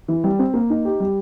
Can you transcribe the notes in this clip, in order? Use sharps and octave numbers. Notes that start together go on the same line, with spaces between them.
E3
G3
C4
A#3
D#4
G4
G3